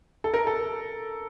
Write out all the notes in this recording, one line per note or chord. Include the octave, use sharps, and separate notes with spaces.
A4
A#4
A4